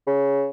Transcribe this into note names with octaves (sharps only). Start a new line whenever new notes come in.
C#3